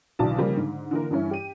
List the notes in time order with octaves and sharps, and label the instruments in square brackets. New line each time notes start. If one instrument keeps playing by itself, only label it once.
[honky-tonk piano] B1 B2 D3 E3 D5 A5
C#3 F3 G3 A#3
G#2 D3
D3 E3 A#3 A#4
G2 E3 C#4 E4
G4 D#7